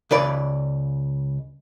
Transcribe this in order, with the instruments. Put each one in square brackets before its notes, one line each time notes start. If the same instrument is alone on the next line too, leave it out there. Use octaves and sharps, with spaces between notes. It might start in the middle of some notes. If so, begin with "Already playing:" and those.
[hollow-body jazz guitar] C#2 B4 D5